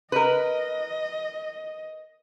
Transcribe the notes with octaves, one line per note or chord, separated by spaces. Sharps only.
A#4 B4 D#5